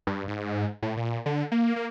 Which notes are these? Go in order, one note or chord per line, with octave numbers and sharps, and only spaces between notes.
G2
G#2
A2
A#2
D3
A#3
A#3